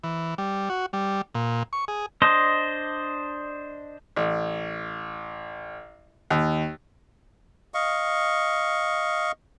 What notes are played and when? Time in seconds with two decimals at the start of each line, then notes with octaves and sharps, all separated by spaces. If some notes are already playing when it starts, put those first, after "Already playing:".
0.04 E3
0.38 G3
0.70 F#4
0.93 G3
1.35 A#2
1.73 C#6
1.88 G#4
2.22 D4 C5 D#5
4.16 A1
6.30 D#2
7.74 D#5 F5 C#6